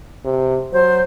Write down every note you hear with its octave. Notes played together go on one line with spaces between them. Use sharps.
C3
F#3 C5